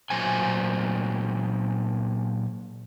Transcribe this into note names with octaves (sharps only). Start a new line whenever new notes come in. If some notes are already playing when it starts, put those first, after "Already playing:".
A#2 F#3 C5 G#5